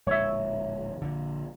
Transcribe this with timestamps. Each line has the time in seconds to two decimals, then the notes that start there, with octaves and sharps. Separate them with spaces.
0.07 D1 A#1 G#3 C#5 E5
1.02 A#1 D3